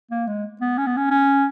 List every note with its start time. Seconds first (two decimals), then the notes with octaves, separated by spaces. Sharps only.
0.11 A#3
0.27 G#3
0.61 B3
0.78 C#4
0.87 B3
0.97 C#4
1.11 C#4